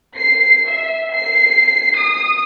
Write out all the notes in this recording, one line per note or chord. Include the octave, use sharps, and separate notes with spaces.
C7
E5
C7
D#6